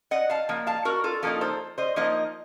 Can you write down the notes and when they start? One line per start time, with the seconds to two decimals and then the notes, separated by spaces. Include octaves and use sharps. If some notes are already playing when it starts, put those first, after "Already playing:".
0.11 D#5 F#5
0.30 F5 A5
0.49 F3 A#3
0.67 F5 A5
0.85 F#4 A#4
1.04 F4 A4
1.23 F3 A#3 D#4 F4 A4
1.41 A4 C5
1.78 C5 D#5
1.96 F3 A#3 D#4 C5 D#5